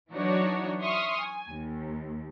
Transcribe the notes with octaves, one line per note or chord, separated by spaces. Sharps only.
E3 F#3 D4 D#4 F#4 C#5
E5 C6 C#6 D#6 F6
G#5
D#2